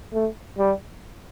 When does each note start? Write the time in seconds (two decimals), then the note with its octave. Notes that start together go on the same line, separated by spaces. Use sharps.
0.13 A3
0.58 G3